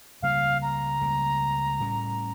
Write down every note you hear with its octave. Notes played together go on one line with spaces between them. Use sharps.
C#2 C#3 G3 A#3 F5
A#5
C#2 C#3 G3 A#3
A2 G3 C#4